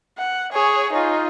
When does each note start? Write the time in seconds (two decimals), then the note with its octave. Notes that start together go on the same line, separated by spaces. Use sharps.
0.18 F#5
0.52 G#4 C#5
0.93 D#4 F4